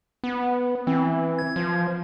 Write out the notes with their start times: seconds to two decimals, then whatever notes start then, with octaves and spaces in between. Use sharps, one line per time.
0.24 B3
0.87 E3 C4
1.39 G#6
1.56 F3